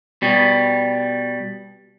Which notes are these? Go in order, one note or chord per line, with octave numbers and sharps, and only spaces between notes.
B2 G3